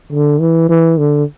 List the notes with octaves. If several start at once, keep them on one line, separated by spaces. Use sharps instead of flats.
D3
E3
E3
D3